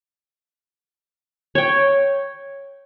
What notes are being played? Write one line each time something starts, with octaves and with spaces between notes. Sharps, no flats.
C#5 G5